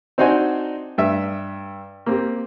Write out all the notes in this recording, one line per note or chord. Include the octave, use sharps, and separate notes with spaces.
C4 D4 D#4 F#4 C5 G#5
G2 E5
A#3 C4 G4